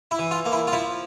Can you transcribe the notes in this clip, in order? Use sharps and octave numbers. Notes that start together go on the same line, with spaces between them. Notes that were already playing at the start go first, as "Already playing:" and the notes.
E4
E3
F4
A#3
E4
F4
F3 E4